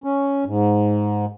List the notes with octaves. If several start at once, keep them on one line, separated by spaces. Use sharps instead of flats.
C#4
G#2